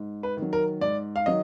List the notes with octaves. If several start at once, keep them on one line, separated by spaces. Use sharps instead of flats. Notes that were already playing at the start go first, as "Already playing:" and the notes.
Already playing: G#2
B4
D#3
F#3
A#4
G#2 D5
F5
D#3 F#3 D#5